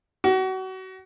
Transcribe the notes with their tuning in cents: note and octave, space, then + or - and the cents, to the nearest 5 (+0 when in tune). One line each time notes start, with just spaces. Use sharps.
F#4 +30